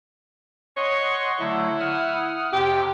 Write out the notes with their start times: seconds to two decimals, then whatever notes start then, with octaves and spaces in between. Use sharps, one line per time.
0.77 C#5 D#5 F#5 C6
1.40 D3 F#3 A3 E4
1.80 F#5 D#6 F6
2.53 F2 C3 G4